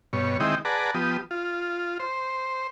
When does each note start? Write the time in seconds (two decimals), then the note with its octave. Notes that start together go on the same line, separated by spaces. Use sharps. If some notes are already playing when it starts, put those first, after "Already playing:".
0.13 G2 B2 C#5
0.40 D#3 G#3 C4 E4 D#5 G5
0.65 G#4 B4 D5 F#5 A5 A#5
0.95 F3 B3 G4 D#6
1.31 F4
2.00 C5